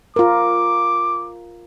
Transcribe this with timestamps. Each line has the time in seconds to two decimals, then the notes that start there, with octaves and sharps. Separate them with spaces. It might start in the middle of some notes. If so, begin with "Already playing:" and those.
0.16 F4 A#4 D6